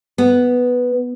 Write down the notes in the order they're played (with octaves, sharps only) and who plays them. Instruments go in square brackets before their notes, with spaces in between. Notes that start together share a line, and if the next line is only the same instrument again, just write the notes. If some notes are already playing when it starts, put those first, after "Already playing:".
[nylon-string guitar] B3